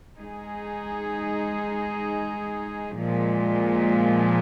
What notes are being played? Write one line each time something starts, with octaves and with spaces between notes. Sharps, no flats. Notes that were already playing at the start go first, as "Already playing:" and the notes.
G#3 D#4 G#4
A#2 F3 G#3